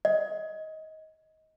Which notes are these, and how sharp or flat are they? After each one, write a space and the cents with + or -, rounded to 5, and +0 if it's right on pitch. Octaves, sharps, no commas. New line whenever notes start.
D#5 +20